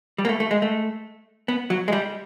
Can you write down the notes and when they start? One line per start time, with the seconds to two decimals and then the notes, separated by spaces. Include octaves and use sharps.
0.18 G3
0.25 A#3
0.29 A3
0.40 A3
0.51 G#3
0.62 A3
1.48 B3
1.70 F#3
1.88 G#3
1.92 G3